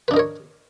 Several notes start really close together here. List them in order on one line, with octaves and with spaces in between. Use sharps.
B4 D4 D#4 A#4 C#5